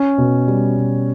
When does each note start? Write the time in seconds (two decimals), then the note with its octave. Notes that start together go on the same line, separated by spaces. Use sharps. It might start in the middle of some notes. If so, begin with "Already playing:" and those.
Already playing: C#4
0.18 B2
0.47 G3
0.77 B2